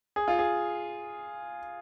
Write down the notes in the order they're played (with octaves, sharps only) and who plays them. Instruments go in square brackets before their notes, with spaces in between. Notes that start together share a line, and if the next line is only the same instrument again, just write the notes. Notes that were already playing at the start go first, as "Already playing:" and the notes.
[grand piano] G#4
F4
G#4